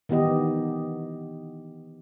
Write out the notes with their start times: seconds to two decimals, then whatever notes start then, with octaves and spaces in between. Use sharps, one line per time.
0.09 D#3 E3 B3 G4 D#5